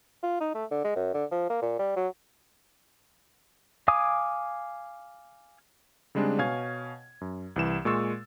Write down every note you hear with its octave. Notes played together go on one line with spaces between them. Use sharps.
F4
D#4
A3
D3
G#3
F#2
D3
F3
A#3
A#2
G3
F#3
F5 G#5 D6 D#6
C#3 G3 G#3 C4 D4
B2 C#5 F5 G#5 G#6
F#2
C2 E3 E7
A#2 G#3 C6 C#6 E6 A6